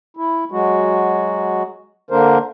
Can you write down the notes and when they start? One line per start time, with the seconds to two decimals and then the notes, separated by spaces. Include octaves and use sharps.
0.17 E4
0.51 F#3 G#3 F#4
2.11 D3 A#3 D4 A#4 C5